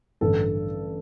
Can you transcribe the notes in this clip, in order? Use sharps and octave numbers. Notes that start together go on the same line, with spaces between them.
A1 G2 D3 A4